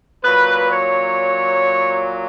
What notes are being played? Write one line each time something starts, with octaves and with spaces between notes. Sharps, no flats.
A#2 F#3 B4
C#5